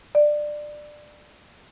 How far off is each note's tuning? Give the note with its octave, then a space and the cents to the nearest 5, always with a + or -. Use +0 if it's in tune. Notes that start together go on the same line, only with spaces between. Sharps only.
D5 +20